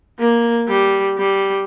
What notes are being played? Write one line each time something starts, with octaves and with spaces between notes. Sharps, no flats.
A#3
G3
G3